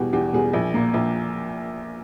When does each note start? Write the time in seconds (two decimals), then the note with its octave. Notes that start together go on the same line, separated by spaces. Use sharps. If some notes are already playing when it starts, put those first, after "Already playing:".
Already playing: E2 B2 G3 G4 G#4
0.13 E2 G4
0.33 B2 G3 G#4
0.53 A#1
0.74 A#2 A#3
0.94 A#1